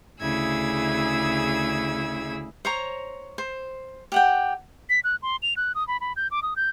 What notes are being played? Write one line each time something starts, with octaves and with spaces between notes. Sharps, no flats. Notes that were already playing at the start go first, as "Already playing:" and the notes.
D2 C#3 E4 G#4 E6 G#6
C5 C#5 A#5
C5
G4 F#5 G5
B6
F#6
C6
F7
F#6
D#6
B5
B5
G6
D6
D#6
G6